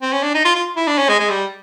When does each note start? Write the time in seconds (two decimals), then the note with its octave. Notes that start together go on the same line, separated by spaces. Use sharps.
0.02 C4
0.12 C#4
0.23 D4
0.34 D#4
0.45 F4
0.56 F4
0.77 E4
0.87 D4
0.98 C#4
1.09 G#3
1.20 G#3
1.30 G3